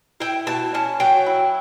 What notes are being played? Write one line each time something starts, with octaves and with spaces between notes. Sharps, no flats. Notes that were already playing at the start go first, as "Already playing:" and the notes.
E4 G5
B2 A5
C#4 A5
F#3 G5
E4